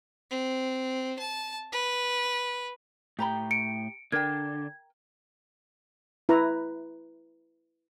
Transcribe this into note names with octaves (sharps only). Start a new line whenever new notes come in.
C4
A5
B4
A2 G4 G5 A#5 B5
C#7 D7
D3 D4 A#4 G5 G#6
E4 B4 A#5